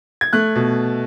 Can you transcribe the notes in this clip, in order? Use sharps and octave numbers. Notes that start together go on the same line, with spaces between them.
G#6
A3 F#6
B2